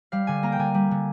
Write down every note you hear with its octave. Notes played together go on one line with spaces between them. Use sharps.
G3 F5
D3 G#5
A#3 A#5
G5
D3 G#5
G3
D3